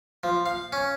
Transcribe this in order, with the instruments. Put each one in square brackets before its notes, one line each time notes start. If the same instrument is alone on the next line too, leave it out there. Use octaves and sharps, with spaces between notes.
[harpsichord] F3
F5
C#4